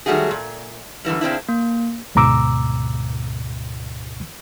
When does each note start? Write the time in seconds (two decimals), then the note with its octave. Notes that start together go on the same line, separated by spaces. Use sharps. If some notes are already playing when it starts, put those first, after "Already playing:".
0.06 D#3 F#3 G3 A3 F#4 G#4
0.31 A#2
1.05 F#2 D3 E3 G3
1.21 C#3 C4 D4 E4
1.49 A#3
2.15 D2 G#2 B2 A#5 D6 E6